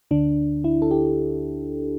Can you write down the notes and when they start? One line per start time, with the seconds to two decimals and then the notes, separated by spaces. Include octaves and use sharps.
0.11 D2 D3 D4
0.64 E4
0.82 A4
0.91 G4